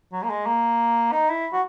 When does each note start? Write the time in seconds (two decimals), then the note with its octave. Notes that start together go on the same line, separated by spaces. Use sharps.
0.13 F#3
0.23 A#3
0.30 G#3
0.46 A#3
1.12 D#4
1.29 E4
1.53 F#4